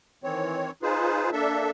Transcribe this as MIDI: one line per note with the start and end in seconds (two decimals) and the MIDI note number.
0.24 0.71 51
0.24 0.71 52
0.24 0.71 60
0.24 0.71 73
0.82 1.30 63
0.82 1.30 65
0.82 1.30 68
0.82 1.30 71
0.82 1.30 72
1.32 1.70 58
1.32 1.70 62
1.32 1.70 69
1.32 1.70 76